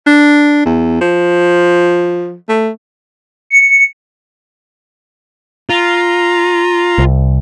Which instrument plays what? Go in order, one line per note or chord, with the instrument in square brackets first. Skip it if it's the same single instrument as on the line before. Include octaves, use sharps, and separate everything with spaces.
[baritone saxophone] D4
E2
F3
A3
[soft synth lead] C#7
[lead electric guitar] F4 [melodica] A#5
[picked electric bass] C2